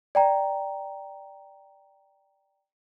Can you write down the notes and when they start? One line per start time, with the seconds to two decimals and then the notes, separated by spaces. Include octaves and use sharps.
0.15 D5 G5 A#5